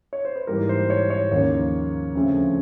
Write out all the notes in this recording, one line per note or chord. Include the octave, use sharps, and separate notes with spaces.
C#5
C5
B4
G#2 E3 G3 A#3 A#4
C5
C#5
C#5
D#2 C#3 F3 A#3 C#5
D2 C#3 F3 A3 C4